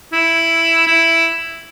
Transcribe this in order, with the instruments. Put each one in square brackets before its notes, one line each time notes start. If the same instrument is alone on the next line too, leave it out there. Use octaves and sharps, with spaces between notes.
[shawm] E4
E4